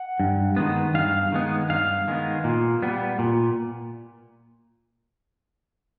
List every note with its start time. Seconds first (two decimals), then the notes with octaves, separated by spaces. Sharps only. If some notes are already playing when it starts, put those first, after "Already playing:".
Already playing: F#5
0.20 G2
0.56 D#3 G#3 B3
0.94 G2 F5
1.32 D#3 G#3 B3
1.70 G2 F5
2.08 D#3 G#3 B3
2.44 A#2
2.82 G3 B3
3.19 A#2